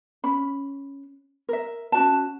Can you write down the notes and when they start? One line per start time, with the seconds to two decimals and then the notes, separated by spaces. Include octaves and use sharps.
0.24 C#4 B5
1.49 A#4 E5
1.92 C#4 F#4 A5